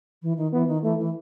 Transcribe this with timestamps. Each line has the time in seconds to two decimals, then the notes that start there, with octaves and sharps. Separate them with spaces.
0.22 E3
0.37 D#3
0.53 E3 B3
0.68 D#3
0.83 E3 A3
0.98 E3